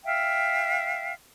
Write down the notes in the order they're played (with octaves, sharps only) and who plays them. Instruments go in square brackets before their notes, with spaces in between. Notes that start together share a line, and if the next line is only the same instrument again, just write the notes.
[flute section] E5 F5 G5